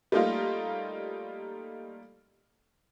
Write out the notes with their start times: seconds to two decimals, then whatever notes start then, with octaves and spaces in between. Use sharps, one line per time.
0.12 G3 A3 A#3 D#4 F4